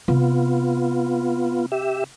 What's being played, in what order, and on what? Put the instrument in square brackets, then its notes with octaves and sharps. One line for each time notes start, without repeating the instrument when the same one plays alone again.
[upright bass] C3 [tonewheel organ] B3 F4
[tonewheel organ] G4 E5